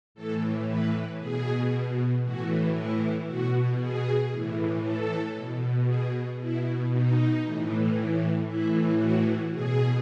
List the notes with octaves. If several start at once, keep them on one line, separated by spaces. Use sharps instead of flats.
A2 E3 A4
B4
B2 G#4
A2 E3 F#4
E4
B2 F#4
G#4
A2 E3
A4
B2
G#4
B2 E4
D#4
A2 E3
A2 E3 E4
F#4
B2 G#4